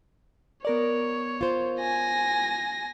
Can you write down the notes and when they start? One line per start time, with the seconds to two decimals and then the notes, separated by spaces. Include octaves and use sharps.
0.65 B3 A#4 C#5 D5
1.41 F4 C5
1.80 G#5 A#6